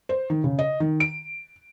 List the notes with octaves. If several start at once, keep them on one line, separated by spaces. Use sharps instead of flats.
C5
D#3
C#3
D#5
D#3
D7